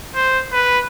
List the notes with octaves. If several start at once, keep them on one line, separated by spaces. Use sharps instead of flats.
C5
B4